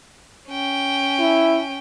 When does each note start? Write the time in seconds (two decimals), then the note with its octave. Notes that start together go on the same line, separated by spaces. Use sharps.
0.49 C#4 G5
1.19 E4